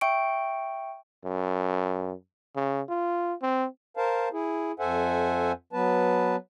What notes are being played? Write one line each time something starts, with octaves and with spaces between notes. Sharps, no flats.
E5 G5 C#6 D7
F#2
C#3
F4
C4
A#4 C5 F5 A5
E4 G#4
F2 A4 C5 E5 F#5 G#5
F#3 B3 B4 A5